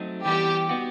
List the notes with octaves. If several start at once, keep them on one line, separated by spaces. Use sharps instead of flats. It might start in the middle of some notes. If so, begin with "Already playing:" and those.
Already playing: F#3 A3 C4 D#4
E3 G3 B3 G4
B3 D#4 F#4